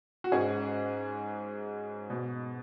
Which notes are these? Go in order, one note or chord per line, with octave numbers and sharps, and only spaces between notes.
F#4
G#2 G#3 C#4 G#4
B2